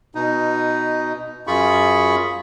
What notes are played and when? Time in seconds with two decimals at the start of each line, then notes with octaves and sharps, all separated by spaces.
0.15 B2 D#4
1.47 F#2 F4 G#4 B5 C#6